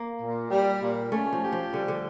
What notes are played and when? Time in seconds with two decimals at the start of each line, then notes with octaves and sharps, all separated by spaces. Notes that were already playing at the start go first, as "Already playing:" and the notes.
Already playing: A#3
0.21 A#2
0.51 G3
0.82 A#2
1.12 A3 C#4
1.33 F3
1.43 G4
1.52 F3
1.73 D3 G3
1.88 D3